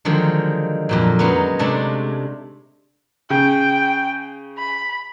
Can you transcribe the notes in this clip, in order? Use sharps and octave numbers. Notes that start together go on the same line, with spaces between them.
D3 D#3 F3 F#3 G#3
F2 A#2 F#3
F#3 G#3 A#3 B3 C#4 D#4
C3 G#3 A3 D4 D5 A5
C#3 G5
B5